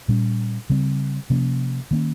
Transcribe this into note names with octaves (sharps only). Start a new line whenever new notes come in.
A#2 G3 C#4
C#3 G3 C4
C3 F3 A#3 C#4
D#3 A#3 C#4